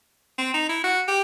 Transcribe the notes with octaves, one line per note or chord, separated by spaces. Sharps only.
C4
D#4
E4
F#4
G4